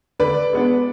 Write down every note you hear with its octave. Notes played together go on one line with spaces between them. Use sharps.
D3 B4 D5
G#3 B3 D4